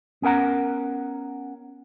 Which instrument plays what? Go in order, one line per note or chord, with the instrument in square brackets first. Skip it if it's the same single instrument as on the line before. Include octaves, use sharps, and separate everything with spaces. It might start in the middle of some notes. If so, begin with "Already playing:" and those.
[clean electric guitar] B3 C#4 A#4 F#5 A#5